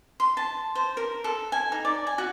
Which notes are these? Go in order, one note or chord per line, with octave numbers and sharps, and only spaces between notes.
C6
A5
C5
A#4
A4
G#5
D#4
D5
G#5
F#4